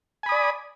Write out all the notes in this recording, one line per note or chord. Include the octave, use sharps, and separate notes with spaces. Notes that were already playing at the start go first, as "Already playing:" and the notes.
D5 G#5 B5 D#6